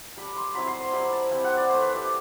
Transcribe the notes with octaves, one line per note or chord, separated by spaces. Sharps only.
G3 D4 B5
C6
F#3 C4 E4 B5
C6
C6
G3 C4 E4 B5
A5
G3 C4 E4 G5
F#5
D5
A3 E4 C5
B4
G4